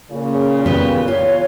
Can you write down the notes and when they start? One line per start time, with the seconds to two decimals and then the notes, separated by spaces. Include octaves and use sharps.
0.11 A#2 C#3
0.66 B3 G4 B4
1.08 F4 C#5